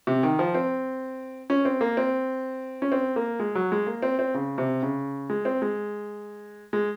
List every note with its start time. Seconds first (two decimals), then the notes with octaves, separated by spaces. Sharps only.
0.07 C3
0.23 D#3
0.39 F3
0.54 C4
1.50 C#4
1.65 C4
1.81 A#3
1.97 C4
2.82 C#4
2.92 C4
3.16 A#3
3.40 G#3
3.55 F#3
3.72 G#3
3.87 A#3
4.02 C4
4.19 C4
4.34 C#3
4.58 C3
4.83 C#3
5.30 G#3
5.45 C4
5.62 G#3
6.73 G#3